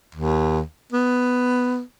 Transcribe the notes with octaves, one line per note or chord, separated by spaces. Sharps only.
D#2
B3